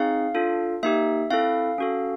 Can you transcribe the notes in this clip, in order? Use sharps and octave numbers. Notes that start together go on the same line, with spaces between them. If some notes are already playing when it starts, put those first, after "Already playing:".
Already playing: C4 D#4 G#4 F5
D4 F4 A4
A#3 D#4 G4 E5
C4 E4 A4 F5
C#4 F#4 A4